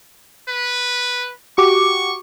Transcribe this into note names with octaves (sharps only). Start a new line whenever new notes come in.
B4
F#4 G4 C#6 D6